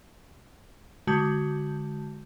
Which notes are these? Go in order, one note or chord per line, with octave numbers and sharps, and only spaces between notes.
D3 G#3 F#4 A5 G6